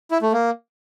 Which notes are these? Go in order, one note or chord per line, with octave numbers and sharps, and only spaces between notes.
E4
A3
A#3